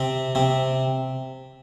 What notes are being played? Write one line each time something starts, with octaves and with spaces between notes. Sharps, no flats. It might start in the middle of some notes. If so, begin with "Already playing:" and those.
Already playing: C3 C4
C3 C4